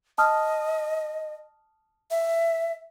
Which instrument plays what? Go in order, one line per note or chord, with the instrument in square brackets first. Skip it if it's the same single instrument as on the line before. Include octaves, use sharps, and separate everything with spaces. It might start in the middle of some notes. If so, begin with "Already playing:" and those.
[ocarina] D#5 [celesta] A5 D#6 F6
[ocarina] E5